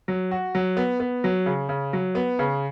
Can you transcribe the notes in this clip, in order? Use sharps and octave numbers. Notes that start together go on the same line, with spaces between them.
F#3
F#4
F#3
B3
B3
F#3
C#3
C#3
F#3
B3
C#3